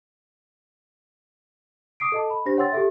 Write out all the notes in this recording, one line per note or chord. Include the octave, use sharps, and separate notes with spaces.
D6 D#6 C7 D7
A4 D#5 A5
B5
D4 G4 C5 A#6
C#5 F#5 G5 C6 E6 A6
G4 A4 E5